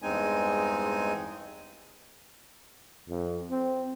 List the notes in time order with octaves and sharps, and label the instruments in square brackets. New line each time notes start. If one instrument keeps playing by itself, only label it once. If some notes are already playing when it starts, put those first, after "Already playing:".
[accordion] E2 G2 G#3 C4 D#4 G#5
[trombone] F2
C4